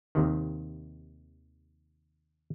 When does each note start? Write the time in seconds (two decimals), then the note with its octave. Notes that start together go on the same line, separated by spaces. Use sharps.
0.15 D#2 C3 D#3